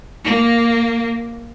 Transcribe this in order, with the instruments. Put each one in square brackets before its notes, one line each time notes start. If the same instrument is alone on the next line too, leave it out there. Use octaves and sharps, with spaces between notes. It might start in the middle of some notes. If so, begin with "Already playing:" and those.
[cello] A#3